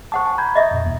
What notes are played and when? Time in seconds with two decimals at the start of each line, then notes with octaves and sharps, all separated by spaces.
0.12 C5 F#5 A5 C#6 D#6
0.26 G#5
0.38 A#5 B5 G6 G#6
0.55 D#5 E5 D#6
0.71 F2 A#2
0.86 D#2